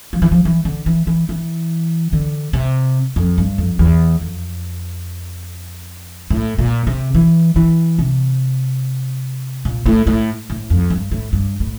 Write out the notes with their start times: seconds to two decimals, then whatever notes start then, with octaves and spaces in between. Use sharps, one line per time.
0.13 F3
0.22 E3
0.31 F3
0.45 E3
0.65 D3
0.86 E3
1.07 E3
1.29 E3
2.13 D3
2.53 C3
3.16 F2
3.38 G2
3.58 F2
3.79 E2
4.21 F2
6.30 A2
6.59 A#2
6.87 C3
7.15 E3
7.56 E3
7.99 C3
9.65 A#2
9.86 A2
10.07 A2
10.50 A2
10.70 F2
10.90 G2
11.12 A2
11.33 G2
11.60 A2